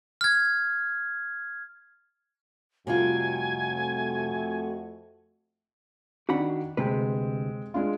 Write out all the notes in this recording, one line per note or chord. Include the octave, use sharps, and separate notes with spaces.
F6 G#6
F2 C3 G3 A3 F4 F#4 G#5
D#3 D4 F#4 F#5 B5
D2 C3 G#3 C4 B4
G#3 D4 F4